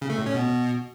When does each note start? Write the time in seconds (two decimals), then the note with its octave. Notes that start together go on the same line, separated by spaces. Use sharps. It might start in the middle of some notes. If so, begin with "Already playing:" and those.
0.02 C#3
0.10 A3
0.18 A2
0.26 C#4
0.34 B2